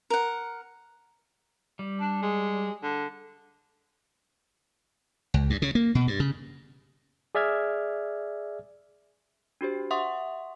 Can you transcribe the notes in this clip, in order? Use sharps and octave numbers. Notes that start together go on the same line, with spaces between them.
A#4 F#5
G3
D4
G#3
D3
C#2
G2
C#3
A#3
B2
G2
C#3
G#4 D5 E5 F6 G#6
D4 F#4 G4 C5
E5 F#5 C6 C#6 D#6